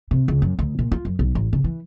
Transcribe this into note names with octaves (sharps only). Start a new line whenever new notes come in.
C3
C#2
F#2
D2
A#2
F4
F#2
B1
A1
C#3
E3